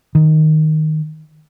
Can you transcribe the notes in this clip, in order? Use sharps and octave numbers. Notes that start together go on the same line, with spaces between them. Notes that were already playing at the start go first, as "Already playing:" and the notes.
D#3